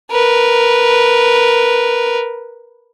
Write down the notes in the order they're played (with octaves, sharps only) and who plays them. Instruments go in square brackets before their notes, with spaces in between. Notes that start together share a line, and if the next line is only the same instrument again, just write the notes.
[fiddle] A#4 B4